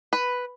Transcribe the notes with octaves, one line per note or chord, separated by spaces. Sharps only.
B4